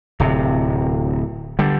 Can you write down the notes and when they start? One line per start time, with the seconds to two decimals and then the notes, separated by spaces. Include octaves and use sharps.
0.20 D1 C3
1.59 D3 G3